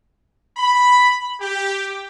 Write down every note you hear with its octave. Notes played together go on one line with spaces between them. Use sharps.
B5
G4